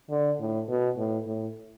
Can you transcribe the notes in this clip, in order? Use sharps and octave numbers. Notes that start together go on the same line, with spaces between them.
D3
A2
B2
A2
A2